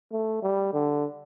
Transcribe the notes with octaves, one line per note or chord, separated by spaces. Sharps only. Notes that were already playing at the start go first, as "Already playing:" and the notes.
A3
G3
D3